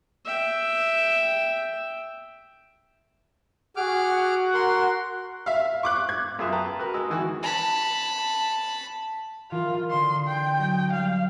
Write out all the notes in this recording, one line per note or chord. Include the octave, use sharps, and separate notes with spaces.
E5 G5
F#4 G#4 F#5 D6 F6
A#4 C6
E5 F5
C#6 D6 F#6
G#6
F#2 F4 G#4 E5
B4 G5 A5 A#5
F#4 A#4 B4
G#3 E6
D#3 E3 F#4
A5 B5
E3 F4 A#4
D3 D#5 C6 E6
G5
F#3 D#5 A#6
G3 F5